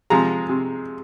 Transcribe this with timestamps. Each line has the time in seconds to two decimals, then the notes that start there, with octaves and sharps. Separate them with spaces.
0.10 C3 F3 G#3 A#5
0.49 C3